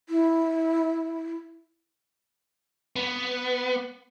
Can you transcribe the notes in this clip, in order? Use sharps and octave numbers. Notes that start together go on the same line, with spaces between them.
E4
B3